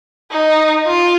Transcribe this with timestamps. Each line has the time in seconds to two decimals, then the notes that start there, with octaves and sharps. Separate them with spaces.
0.31 D#4
0.87 F4